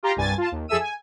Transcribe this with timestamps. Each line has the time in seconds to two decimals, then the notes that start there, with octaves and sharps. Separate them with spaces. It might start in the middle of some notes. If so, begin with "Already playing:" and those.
0.03 F4 G4 A#5 C6
0.16 C2 G2 G#5 A6
0.38 F4 A5
0.52 D#2
0.68 F2 G#4 A4 E5 E6 D#7
0.80 G#5